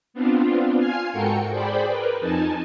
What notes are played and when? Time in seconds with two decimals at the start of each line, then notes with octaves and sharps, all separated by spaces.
0.14 B3 C4 D4 F4
0.78 F4 G#5 F6 G#6 C7
1.12 G#2 F#4 A4 A#4 G5 C#7
1.50 G#4 C5 D5 G5 B5
1.87 A#4 B4
2.20 F2 D#4 G#5 A5